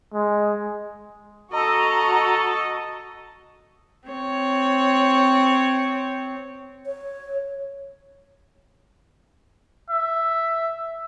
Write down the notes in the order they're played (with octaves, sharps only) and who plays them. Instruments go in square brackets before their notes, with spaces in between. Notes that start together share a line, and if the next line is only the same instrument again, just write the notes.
[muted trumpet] G#3
[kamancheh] F#4 C#6 [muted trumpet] A4 [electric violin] D#5 [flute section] A#5
[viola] C4 C#5
[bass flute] C#5
[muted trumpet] E5